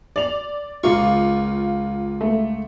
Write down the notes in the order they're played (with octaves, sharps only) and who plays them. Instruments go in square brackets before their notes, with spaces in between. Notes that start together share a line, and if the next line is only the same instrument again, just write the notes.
[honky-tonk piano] D5 F7
[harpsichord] C#2 A#3 C#6 [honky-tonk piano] F4
[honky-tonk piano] A3